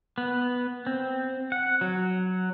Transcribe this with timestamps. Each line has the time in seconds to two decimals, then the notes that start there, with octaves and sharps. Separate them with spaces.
0.18 B3
0.86 C4
1.52 F#5
1.81 F#3